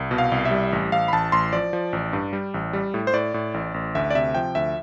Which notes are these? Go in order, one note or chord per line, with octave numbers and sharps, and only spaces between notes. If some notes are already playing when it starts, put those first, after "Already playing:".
Already playing: C2
B2
F5
C2
E5
G3
A1
A1 F5
B5
A1 A5
A1 C6
F3 D5
F3
A1
G2
G3
A1
G3
A2
C5
A2 D5
A2
A1
A1
D2 E5
D5
C3 E5
F3 G5
D2 E5